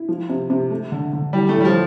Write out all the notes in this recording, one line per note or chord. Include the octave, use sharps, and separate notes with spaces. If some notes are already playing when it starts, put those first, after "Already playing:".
Already playing: E4
F3
C3
C3
A3
D3
D3
E3 G3
A3
A2
G3
F3